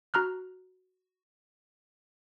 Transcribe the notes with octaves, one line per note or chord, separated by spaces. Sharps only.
F#4 A#5 F6 F#6